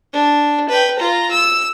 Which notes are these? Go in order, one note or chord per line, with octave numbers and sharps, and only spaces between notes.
D4
B4 G5
F4 A#5
E6